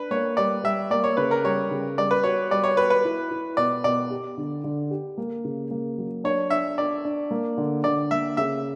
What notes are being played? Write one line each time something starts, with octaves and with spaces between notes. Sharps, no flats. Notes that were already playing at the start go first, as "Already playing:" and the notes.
Already playing: D4 B4
A#3 C#5
G3 D5
G3 E5
A#3 D5
C#5
C#3 B4
A#4
G3 C#5
C#3
G3 D5
B4
F#4 C#5
G3 D5
C#5
F#4 B4
B4
E4
E4
B2 D5
B2 D5
G4
D3
D3
G4
A#3
C#3
A#3
F#3
D4 C#5
D4 E5
D4 D5
D4
A#3
D3
D3 D5
A#3 E5
C#3 E5